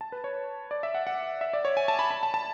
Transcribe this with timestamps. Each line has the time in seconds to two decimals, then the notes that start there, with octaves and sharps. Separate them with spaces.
0.01 A5
0.12 B4
0.24 C#5
0.71 D5
0.83 E5
0.95 F#5
1.07 F#5
1.41 E5
1.53 D5
1.65 C#5
1.77 G#5
1.88 A5
1.99 B5
2.11 B5
2.23 A5
2.34 A5